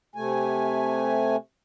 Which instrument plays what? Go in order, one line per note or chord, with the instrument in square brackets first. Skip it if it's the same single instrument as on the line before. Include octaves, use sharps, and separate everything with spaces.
[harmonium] C3 A3 G#5